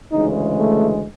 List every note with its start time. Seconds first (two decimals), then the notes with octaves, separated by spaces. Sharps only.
0.12 D2 C#3 E3 G#3 D#4
0.58 A3